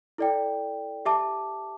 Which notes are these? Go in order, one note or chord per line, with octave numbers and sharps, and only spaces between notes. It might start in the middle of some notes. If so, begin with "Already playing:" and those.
E4 A4 D5 G5
G4 E5 A5 D6